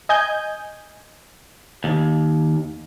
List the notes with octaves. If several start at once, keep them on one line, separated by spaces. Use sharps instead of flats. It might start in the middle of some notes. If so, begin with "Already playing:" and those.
D#5 G#5 G6
D#2